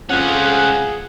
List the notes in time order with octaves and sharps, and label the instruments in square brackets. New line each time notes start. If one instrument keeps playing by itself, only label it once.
[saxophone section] F2 F#5 [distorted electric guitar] C#4 F4 [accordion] G#4